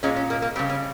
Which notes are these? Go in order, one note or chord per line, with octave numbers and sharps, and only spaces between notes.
A#2 G#3 C#4
C#4
A#3
A#3
C#3 G3 C4
C#4